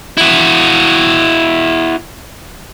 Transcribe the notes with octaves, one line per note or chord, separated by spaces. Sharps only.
E4 F#4